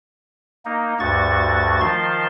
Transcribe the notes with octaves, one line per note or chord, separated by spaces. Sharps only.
A#3 D#4
D2 G2 F#4 C#6 A6
D#3 F3 A5 C6